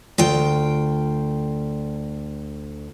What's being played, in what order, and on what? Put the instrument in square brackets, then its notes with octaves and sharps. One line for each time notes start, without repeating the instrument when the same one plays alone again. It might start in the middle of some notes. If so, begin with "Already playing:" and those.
[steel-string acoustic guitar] D2 F4 G5